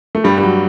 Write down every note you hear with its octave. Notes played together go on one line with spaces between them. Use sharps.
A3
G2 G3
G3
F#3